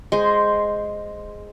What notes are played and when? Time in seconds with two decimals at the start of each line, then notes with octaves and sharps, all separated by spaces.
0.12 G#3 C5